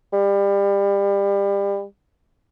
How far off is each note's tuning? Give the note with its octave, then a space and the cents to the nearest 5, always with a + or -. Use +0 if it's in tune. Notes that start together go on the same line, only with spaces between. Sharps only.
G3 +30